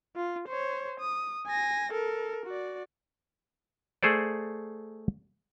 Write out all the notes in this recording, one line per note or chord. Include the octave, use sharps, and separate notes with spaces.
F4
C5 C#5
D#6
G#5 A#6
A4 A#4
F#4 D5
A3 G#4 A4 C5 D5